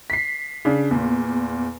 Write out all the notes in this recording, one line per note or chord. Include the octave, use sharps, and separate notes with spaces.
B6 C7
C#3 D4
E2 A#2